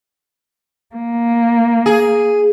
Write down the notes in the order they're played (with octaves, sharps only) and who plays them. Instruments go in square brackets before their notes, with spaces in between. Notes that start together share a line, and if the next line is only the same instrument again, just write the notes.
[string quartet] A#3
[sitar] G#4